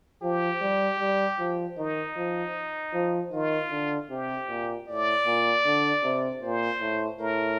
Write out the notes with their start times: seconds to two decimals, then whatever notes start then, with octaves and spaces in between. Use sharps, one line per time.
0.22 F3 G4
0.62 G3
1.00 G3
1.39 F3
1.78 D#3 D#4
2.17 F3
2.94 F3
3.33 D#3 F4
3.71 D3
4.10 C3 G4
4.49 A#2
4.87 A2 D5
5.26 A#2
5.65 D3
6.04 C3
6.42 A#2 C5
6.81 A2
7.19 A2 A#4